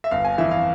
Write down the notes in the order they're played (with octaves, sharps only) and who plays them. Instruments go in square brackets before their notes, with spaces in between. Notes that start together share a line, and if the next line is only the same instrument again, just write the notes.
[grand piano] E5
G1 F5
G#5
F2 E3 E5
F5